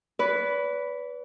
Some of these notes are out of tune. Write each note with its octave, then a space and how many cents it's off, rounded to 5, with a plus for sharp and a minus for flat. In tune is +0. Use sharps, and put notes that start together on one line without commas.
B4 +0 D5 -40